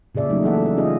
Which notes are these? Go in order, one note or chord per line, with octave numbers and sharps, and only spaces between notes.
A#2 C#3 G#4 D5 E5
F#3 G3 A3 A#3 C#4 D#4
E3 A#3 E4 A4 E5 F#5
A4 D5
C#3 C#4 D#4 F4 G#4 D#5